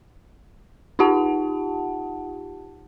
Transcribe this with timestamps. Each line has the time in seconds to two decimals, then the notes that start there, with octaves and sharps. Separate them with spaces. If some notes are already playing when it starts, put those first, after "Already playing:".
0.99 D#4 F4 G4 F#5 A5